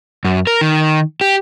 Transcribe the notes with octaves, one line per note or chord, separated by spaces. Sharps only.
F#2
A#4
D#3
G4